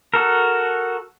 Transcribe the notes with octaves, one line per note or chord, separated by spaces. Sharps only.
F#4 A4 A#4